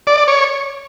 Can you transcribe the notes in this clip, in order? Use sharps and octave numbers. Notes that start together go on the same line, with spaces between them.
D5
D5
C#5